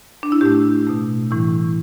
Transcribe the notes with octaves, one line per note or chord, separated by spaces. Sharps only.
D4
E4
A2 A3 G4
B2 A3
A2 E3 G3 E4